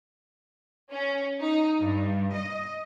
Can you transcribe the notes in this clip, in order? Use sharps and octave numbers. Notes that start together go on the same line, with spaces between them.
C#4
D#4
G2
D#5